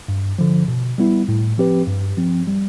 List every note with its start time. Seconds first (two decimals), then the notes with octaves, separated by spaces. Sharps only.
0.08 G2
0.39 D3 F3
0.68 B2
0.98 G3 B3 E4
1.28 A2
1.58 F3 C4 G4 B4
1.87 G2
2.17 F3 C4
2.47 G3